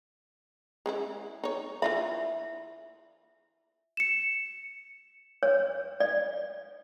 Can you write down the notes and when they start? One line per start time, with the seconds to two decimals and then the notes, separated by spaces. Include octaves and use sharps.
0.86 G#3 C#4 E4
1.44 D#4 C#5
1.82 E3 F4 E5 B5
3.97 C#7 E7
5.43 C#5
6.00 D5